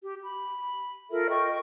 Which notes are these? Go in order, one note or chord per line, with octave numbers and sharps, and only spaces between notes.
G4
B5
F4 A4 A#4 E5
D#5 G5 C#6